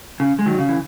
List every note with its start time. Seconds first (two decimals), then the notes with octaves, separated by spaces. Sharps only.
0.20 C#3
0.39 G#3
0.46 D#3 F#3
0.58 C#3
0.69 E3